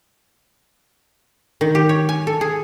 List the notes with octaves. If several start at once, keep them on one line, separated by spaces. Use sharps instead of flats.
D#3
G4
C#5
G#5
A4
G#4